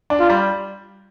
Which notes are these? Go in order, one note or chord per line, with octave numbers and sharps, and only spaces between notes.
D4
F4
G3